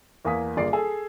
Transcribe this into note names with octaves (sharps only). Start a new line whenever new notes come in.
E2 A#3 F5 G#5 D#6 B6
G1 A#3 F4 G#4 D5 C7
G#4 A4 G#5